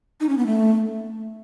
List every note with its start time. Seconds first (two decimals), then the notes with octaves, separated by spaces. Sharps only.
0.21 D#4
0.29 C#4
0.38 B3
0.46 A3